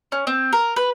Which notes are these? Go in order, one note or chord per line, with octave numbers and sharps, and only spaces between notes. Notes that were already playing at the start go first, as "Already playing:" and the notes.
C#4
C4
A#4
B4